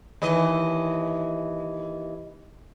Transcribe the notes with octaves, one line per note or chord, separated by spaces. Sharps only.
D#2 E3 D#5